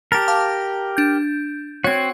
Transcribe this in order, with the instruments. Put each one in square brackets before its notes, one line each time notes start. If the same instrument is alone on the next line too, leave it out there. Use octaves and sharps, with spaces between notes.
[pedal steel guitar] G4 A#4 [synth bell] A5 A6
[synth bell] F5 A5 D6
D4 G6
[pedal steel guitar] C4 F#4 [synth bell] C#5 G#6